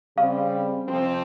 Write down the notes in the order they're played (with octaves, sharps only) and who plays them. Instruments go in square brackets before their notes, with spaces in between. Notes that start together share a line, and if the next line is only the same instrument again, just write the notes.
[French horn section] C#3 G3 C4 [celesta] F5
[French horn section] F2 C3 F3 C4